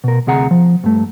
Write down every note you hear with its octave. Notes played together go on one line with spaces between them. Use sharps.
B2 A#4
D2 C3 G#4 F#5 A#5
F3
G2 A3